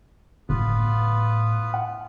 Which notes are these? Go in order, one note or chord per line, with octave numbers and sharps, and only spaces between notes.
G1 A2 B3 F4 B4
F#5